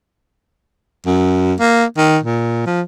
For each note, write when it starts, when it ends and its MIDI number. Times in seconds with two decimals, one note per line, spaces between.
1.06 1.53 42
1.59 1.84 58
1.97 2.17 51
2.23 2.65 46
2.66 2.81 53